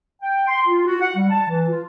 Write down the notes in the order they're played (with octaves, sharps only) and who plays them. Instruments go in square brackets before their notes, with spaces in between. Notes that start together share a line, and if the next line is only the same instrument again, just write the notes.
[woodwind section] G5
C6
F4
F#4
F#5
G3
A5
E3
F4